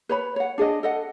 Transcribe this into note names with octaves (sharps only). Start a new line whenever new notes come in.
B4 C#5 B5
C#5 F#5
D4 G#4 D5 D#5
A4 D#5 F#5